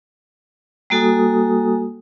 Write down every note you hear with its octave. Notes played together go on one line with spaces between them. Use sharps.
G3 A#3 F#4 A4 G#5 D#6